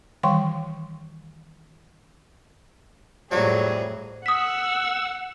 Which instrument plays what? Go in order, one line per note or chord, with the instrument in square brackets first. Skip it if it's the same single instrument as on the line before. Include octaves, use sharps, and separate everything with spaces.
[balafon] D#3 E3 G3 G5 C6 C#6
[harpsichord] F2 G3 [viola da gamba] A2 G#4 [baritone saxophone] F#3
[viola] F#5 [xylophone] D#6 B6 [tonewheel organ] E6